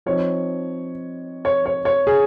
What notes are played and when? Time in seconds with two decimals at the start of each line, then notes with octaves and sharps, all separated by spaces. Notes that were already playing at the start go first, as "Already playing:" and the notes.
0.06 F3 C4 D#4 C#5
1.45 C#5
1.66 C#5
1.85 C#5
2.07 G#4